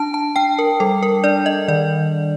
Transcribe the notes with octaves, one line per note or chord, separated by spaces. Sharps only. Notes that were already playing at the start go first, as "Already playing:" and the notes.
Already playing: D4 A5
A5
D4 G5
A#4
G3 A4
A#4
D4 D5
D#5
D#3 D5